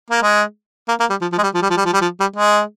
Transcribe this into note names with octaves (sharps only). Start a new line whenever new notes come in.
A#3
G#3
A#3
A#3
G3
F3
F3
G#3
G3
F3
G3
F3
G3
F3
G3
F3
G3
G#3